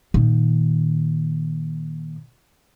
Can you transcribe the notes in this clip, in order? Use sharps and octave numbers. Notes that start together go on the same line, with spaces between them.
A#2 D#3